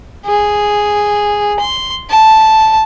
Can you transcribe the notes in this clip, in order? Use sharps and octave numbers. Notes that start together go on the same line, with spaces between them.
G#4
C6
A5